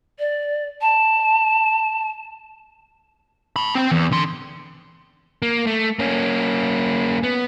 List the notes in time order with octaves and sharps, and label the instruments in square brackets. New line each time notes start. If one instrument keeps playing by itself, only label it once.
[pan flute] D5
A5
[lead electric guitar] A5 B5
C4 G5
E2
D3 C6
A#3
A3
A#3 C#4
B3